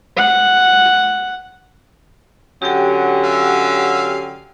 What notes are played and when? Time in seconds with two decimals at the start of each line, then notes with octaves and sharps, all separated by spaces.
0.17 F#5
2.62 D3 F#3 C#4 G4 G5
3.24 E5 F5